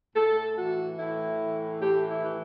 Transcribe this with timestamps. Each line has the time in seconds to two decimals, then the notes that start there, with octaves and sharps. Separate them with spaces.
0.16 A2 A4
0.57 E3 F#4
0.99 A2 E4
1.40 E3
1.81 A2 G4
2.10 E4
2.24 E3